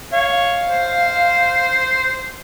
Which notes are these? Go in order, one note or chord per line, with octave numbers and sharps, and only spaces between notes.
C#5 F5
C5